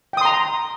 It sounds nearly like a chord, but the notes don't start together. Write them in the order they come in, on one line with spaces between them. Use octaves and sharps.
G5 D#6 C6 A#5